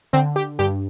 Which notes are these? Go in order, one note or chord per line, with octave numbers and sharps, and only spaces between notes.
D3 C4
G4
G2 G4